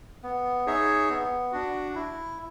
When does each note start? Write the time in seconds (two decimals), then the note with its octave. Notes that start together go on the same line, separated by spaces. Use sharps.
0.23 B3
0.66 D#4 G#4 C#5 E5
1.10 B3
1.52 D4 F#4
1.95 E4